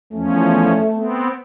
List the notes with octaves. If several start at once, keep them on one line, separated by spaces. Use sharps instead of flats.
E2 F3 A3 C#4
B3 C4